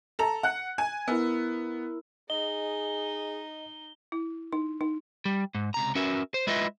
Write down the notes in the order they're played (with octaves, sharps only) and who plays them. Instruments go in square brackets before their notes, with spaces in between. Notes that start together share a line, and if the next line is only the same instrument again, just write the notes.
[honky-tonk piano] A4 A#5
F#5 F#6
G#5
[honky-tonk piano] B3 [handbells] E4 A#4 E6
[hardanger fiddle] D#4 [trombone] G#4 [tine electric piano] D#5 [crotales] G7
[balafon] E4
D#4
D#4
[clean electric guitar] G3
G#2
C#2 C3 A#5
C#4 F#4 A#4 B4 E5
C5
G#3 E4 F4 B4 D#5 E5